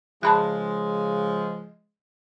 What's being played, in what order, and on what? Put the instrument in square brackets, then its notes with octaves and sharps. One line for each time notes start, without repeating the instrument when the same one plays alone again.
[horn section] C#3 F3 G#3 [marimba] A5 B5 F#6